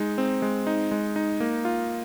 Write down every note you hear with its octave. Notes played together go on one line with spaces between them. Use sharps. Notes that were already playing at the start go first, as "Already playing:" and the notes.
Already playing: G#3 D#4
C4
G#3
D#4
G#3
D#4
A#3
F4